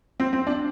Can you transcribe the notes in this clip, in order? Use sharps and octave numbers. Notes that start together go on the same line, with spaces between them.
C4
C4
D4